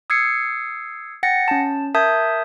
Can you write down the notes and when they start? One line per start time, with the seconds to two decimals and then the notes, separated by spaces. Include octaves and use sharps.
0.10 D#6 E6 G#6 C7 C#7
1.23 F#5 G5 A6 A#6 C#7
1.48 C#4 A5
1.95 A#4 E5 A5 D#6 G6 G#6